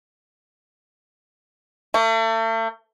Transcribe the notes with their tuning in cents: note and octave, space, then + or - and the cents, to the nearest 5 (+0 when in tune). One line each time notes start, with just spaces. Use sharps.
A3 +40